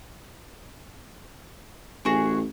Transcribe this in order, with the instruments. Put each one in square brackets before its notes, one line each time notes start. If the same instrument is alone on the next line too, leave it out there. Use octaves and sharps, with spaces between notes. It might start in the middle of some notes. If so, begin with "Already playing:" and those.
[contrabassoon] A1 [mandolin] F#4 G#4